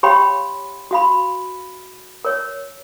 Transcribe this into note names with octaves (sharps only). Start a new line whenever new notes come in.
G4 C#5 F5 G5 B5 C6
F#4 F5 B5
A#4 C#5